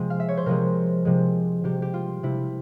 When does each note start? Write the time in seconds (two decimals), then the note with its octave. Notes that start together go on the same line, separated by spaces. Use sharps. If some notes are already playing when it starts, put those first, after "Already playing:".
Already playing: C3 F3 G#3
0.10 F5
0.20 E5
0.29 C#5
0.37 C5
0.46 C3 F3 G#3 A#4
1.05 C3 F3 G#3
1.64 C3 G3 G4
1.82 G4
1.94 F4
2.23 C3 G3 E4